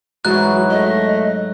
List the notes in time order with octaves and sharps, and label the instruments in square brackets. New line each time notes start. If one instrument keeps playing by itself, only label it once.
[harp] G#2 F#3 [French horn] E3 [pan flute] F#4 [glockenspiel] F#6
[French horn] A3 [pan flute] D#5